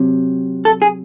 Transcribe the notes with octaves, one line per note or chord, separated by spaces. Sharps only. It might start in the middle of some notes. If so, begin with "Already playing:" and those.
Already playing: C3 F#3
A4
G#4